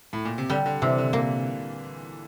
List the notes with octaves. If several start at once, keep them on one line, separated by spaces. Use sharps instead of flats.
A2
A#2
C3
D3 G3
D3
C3 E3
D3
A#2 A#3